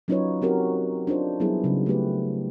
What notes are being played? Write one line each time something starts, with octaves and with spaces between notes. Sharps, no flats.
F#3 C#4 D#4 F4 B4 C#5
C4 F#4 G4 A#4
D4 D#4 F4 C5
F#3 G3 B3 E4 G#4
C#3 F#3
A3 D#4 G4 B4